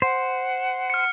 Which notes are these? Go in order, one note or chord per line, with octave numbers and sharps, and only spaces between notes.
C5 F#5
F6 C#7